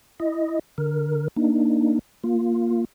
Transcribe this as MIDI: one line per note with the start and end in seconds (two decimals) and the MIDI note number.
0.20 0.59 64
0.20 0.59 75
0.78 1.28 50
0.78 1.28 70
1.36 1.99 58
1.36 1.99 62
1.36 1.99 63
2.24 2.85 58
2.24 2.85 65